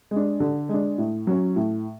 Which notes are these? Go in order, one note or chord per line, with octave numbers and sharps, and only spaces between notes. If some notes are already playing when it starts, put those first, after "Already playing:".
G#3
D4
D3
G#3 D4
A2
F#3 C#4
A2